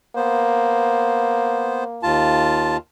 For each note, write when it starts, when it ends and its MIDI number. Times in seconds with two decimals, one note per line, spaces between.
0.16 2.11 58
0.16 1.84 59
0.16 1.84 72
2.03 2.77 39
2.03 2.77 65
2.03 2.77 81